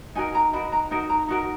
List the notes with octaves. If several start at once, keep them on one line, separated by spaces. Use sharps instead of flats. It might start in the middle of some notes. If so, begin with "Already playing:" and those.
D#4 F#4 A#4 G#5
A#5
D#4 F#4 A#4 B5
A#5
D#4 F#4 A#4
A#5
D#4 F#4 A#4